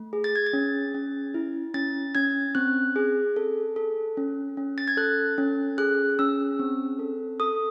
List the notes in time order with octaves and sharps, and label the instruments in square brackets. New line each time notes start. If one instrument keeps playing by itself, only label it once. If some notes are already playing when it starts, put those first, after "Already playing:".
Already playing: [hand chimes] A3
G#4
A6
G#6
A6
C#4
C#4
E4
C#4 A6
C#4 G#6
C4 F#6
G#4
A4
A4
C#4
C#4
A6
G#6
A4 F#6
C#4
G#4 F#6
C#4 E6
C4
A4
A4 D#6